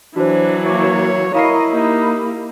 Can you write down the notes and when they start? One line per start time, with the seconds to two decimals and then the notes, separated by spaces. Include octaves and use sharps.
0.16 E3 F#3 D4 F#4 C5
0.66 A#3 C#5 E5 D6
1.35 E4 A#4 D#5 F5 A#5 C7
1.71 A#3 D#4 G4